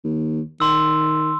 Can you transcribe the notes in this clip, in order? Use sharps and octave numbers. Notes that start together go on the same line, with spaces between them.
D#2
D#3 C6 E6